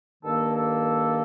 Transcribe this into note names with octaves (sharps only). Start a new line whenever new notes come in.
G2 D#3 A#3 A4
A4